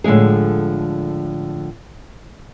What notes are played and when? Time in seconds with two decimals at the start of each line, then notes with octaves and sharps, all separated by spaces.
0.04 A2 D3 F3 G#3 G#4